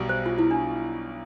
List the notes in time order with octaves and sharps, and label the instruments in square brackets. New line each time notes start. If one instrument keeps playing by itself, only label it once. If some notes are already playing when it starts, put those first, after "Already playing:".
Already playing: [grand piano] B1 B2 G3
[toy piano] C5
F4
E4
D4